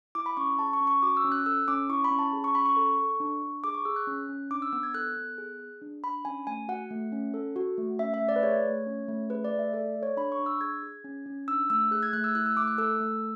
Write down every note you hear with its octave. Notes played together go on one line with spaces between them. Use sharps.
E4 D6
B5
C#4 C#6
G#4 A5
C#6
C#4
C#6
F#4 D6
E6
C#4
F#6
A4 E6
C#4 D6
E4 C#6
B5
C#4
A5
G#4
C#6
C#4 B5
C#6
A4
A4
D4
D4
G#4 D6
C#6
G#4 E6
F#6
C#4
C#4
D4 D6
E6
B3 E6
G#6
A4 F#6
B3
G#4
G#4
D4
D4 B5
C#4 G#5
A3 G#5
F#4 F#5
A3
C#4
A4
F#4
A3
C#4 E5
E5
A3
D5
B4
G#4 C#5
A3
C#4
A3
G#4 B4
D5
A3
E5
A4 D5
A4
C#5
D4 B5
C#6
D4
E6
G#4 G#6
G#4
C#4
C#4
D4 E6
A3 E6
G#4 F#6
G#6
A3 F#6
E6
E4 F#6
E6
A3 D6
F#6
A4 E6
A3